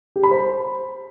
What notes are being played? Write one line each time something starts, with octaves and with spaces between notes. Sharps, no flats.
G4
B5
C5